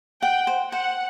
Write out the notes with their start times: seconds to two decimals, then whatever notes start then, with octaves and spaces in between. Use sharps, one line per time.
0.22 F#5 G5
0.47 C5
0.72 C5 F#5